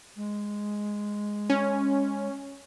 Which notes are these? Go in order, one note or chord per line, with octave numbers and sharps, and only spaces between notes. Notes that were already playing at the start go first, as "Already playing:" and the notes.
G#3
C#4